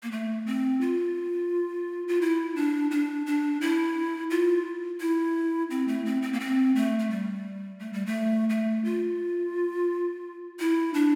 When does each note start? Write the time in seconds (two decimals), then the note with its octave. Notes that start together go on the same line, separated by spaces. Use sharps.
0.03 A#3
0.11 A3
0.47 C4
0.81 F4
2.08 F4
2.21 E4
2.56 D4
2.91 D4
3.26 D4
3.61 E4
4.30 F4
5.00 E4
5.70 C4
5.88 A3
6.05 C4
6.22 C4
6.33 A#3
6.40 C4
6.76 A3
6.99 A3
7.10 G3
7.80 A3
7.93 G3
8.06 A3
8.50 A3
8.84 F4
10.59 E4
10.94 D4